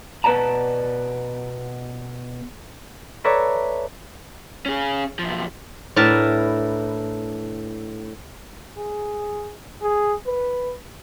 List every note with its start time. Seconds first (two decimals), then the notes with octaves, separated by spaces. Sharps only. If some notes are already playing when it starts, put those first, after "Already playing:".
0.24 B2 B4 D5 A5 A#5
3.24 A4 B4 C#5 D5 E5 A#5
4.66 C#4 G#4
5.19 B1 F3
5.96 A2 D4 A#4 B4 A5
8.77 G#4
9.82 G#4
10.26 B4